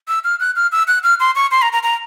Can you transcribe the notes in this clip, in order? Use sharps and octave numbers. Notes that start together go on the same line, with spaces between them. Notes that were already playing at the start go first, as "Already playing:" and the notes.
E6
F6
F#6
F6
E6
F#6
F6
C6
C#6
C6
A#5
A#5
A#5